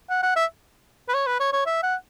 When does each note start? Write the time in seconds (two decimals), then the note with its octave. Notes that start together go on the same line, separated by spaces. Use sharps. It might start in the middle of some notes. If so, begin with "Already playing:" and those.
0.10 F#5
0.23 F#5
0.36 E5
1.09 B4
1.14 C#5
1.27 B4
1.40 C#5
1.53 C#5
1.66 E5
1.83 F#5